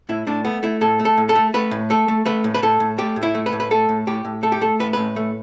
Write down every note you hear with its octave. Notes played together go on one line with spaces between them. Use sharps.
A2 E4
A2 D4
A3 B3
A3 E4
A2 A4
A3
A4
A2
A4
A3
A3 B4
A2
A3 A4
A3
A3 B4
A2
B4
A2 A4
A2
A3 G4
A2
E4
A3
B4
A2
B4
A3 A4
A2
A2 G4
A2
A3 A4
G4
A3 A4
A2 B4
A2 B4
A3